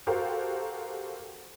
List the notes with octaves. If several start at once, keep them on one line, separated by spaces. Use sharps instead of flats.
F#4 G4 A4 A#4 C5 F5